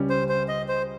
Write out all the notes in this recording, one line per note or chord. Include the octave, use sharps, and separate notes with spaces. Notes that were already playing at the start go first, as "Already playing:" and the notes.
Already playing: C#2 C#3 G3 C#4
C5
C5
D#5
C5